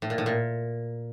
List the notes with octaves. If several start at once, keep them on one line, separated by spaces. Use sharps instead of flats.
A2
A#2
A2
A#2